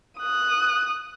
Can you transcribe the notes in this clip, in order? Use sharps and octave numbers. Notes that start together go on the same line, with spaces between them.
D#6 F#6